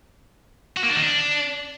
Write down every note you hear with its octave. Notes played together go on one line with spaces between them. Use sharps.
F#4
A#3
D4
D#3
D4